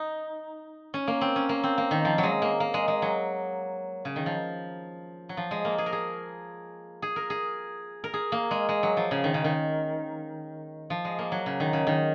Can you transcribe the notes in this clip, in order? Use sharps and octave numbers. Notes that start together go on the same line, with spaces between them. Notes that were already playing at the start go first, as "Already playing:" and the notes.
Already playing: D#4
C#4
A#3
C4
C#4
A#3
C4
A#3
D#3
F3
F#3
G#3
A#3
A#3
G#3
G#3
F#3
C#3
D#3
F3
F#3
F3
G#3
A#3
G#4
A#4
G#4
G#4
A#4
G#4
A#4
G#4
A#3
G#3
G#3
F#3
F3
C#3
D#3
C#3
D#3
F3
G#3
A#3
F#3
C#3
D#3
C#3
D#3